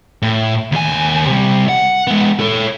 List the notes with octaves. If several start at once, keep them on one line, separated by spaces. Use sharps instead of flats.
A2
D#2 G#5
C3 G3
F#5
G#3 B3
A4 C#5